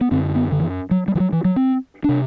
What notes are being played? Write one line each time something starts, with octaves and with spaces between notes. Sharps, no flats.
B3
F#2 D3 C4
B3
D3
E3
F#3
G3
E3
F#3
E3
F#3
C4
C3 D4